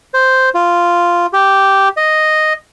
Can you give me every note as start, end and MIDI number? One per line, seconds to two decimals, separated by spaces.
0.14 0.49 72
0.55 1.26 65
1.33 1.89 67
1.97 2.53 75